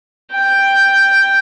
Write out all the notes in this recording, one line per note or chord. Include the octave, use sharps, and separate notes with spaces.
G5